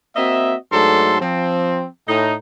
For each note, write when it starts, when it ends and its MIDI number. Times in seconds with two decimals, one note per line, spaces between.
0.16 0.55 58
0.16 0.55 60
0.16 0.55 66
0.16 0.55 75
0.16 0.55 76
0.72 1.17 44
0.72 1.17 54
0.72 1.17 57
0.72 1.17 62
0.72 1.17 69
0.72 1.17 84
1.20 1.85 53
1.20 1.85 60
2.08 2.34 45
2.08 2.34 63